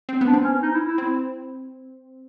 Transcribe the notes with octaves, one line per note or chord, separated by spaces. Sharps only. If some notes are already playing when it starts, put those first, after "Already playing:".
C4
B3
D4
C4
C#4
D#4
E4
E4
C4